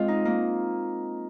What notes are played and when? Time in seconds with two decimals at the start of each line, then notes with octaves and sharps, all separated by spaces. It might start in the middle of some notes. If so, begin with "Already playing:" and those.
Already playing: G#3 C4 F4
0.08 D#4
0.25 A#3